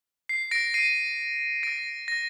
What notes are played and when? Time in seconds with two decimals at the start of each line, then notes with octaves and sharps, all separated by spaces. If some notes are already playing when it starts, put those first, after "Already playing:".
0.29 C7
0.51 A#6 D7
0.74 C7 D#7
1.63 A#6 D7
2.08 A#6